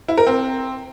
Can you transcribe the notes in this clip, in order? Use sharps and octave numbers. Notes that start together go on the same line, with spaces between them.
E4
A#4
C4